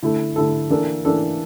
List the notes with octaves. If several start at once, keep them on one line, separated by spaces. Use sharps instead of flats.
D3 A3 E4 A4
D3 A3 E4 A4
E3 A#3 D4 A4
E3 A#3 D4 A4